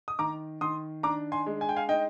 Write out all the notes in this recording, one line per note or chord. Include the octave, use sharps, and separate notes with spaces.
D#6
D#3 A#5 D6
D#3 C6 D#6
D4 A#5 D6
G#5 C6
G#3
G#5
G5
F5 G#5
D#4 D#5 G5